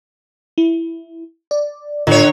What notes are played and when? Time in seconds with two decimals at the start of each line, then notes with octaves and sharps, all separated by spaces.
0.58 E4
1.51 D5
2.07 A2 D3 A3 F4 C#5